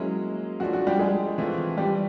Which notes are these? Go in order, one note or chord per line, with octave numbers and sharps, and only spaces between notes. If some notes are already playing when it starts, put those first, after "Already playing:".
Already playing: F#3 G#3 A#3 C#4 E4 G#4
F3 A3 D4 F#4
F#4
G3 G4
G#3 G#4
E3 A3 C4 F4
G3 G4